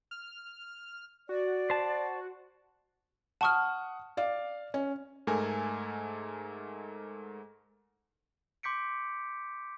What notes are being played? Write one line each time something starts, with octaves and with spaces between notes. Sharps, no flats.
F6
F#4 D5
C5 A5
F#5 A5 C#6 D#6 F6
D5 F5
C#4
G#2 A3 A4 A#4 G#5
C6 D6 G6 B6 C#7 D7